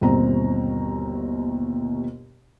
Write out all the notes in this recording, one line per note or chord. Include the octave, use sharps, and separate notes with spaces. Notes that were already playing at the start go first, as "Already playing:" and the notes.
G1 D#2 B2 C4 A#5